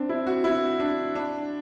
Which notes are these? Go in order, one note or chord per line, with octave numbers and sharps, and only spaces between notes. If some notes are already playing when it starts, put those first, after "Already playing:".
Already playing: C4 D4
E4
F#4
E4
D4
D4